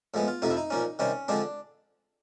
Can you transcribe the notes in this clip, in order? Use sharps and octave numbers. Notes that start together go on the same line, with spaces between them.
A2 F3 G#3 B3
F4
F2 C3 F3 A3 D#4
E4
D#4
A#2 F3 A#3 C#4
C3 D#3 G3 C4 C#4
D3 F3 G#3 C4 D4